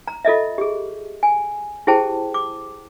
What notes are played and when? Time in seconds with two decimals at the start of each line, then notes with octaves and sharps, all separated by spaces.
0.08 A#5
0.25 F4 A4 D#5 E5
0.58 G4 G#4
1.23 G#5
1.87 E4 G4 G#4 C5 G5 A5
2.34 D6